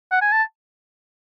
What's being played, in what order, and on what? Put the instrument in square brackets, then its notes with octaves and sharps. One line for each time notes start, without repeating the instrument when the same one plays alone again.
[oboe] F#5
G#5
A5